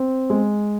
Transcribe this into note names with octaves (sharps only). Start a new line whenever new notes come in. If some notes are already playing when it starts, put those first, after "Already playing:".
Already playing: C4
G#3